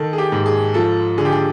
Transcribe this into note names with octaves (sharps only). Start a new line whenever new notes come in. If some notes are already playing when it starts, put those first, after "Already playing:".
Already playing: D#3 A4
G#4
G4
G#2
G#4
F3 A4
D3 G#4
G4
G#4